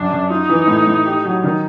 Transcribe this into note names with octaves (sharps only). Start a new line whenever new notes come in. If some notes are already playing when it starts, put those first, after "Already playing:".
Already playing: F#2 D4
F#2
D#4 F4
E3
A2
A2
G4
F#3
D#3